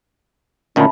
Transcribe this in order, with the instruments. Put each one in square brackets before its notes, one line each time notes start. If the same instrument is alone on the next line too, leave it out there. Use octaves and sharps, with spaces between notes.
[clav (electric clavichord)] D2 A#2 D#3 [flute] C#4 [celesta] E5 A5 B5